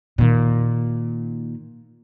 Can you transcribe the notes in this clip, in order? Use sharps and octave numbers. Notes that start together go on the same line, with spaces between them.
A#2 D#3